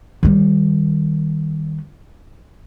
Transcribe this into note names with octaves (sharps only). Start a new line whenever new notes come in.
D#3 G3